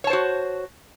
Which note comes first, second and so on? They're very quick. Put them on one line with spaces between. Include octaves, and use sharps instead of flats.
C#5 A5 C5 F#4